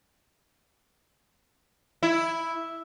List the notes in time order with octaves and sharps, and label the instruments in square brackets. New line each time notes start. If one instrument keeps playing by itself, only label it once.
[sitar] E4